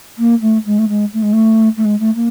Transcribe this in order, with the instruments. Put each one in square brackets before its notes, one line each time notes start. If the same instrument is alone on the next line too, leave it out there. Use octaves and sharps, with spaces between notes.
[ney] A#3
A3
G#3
A3
G#3
A3
G#3
A3
A3
G#3
A3
A#3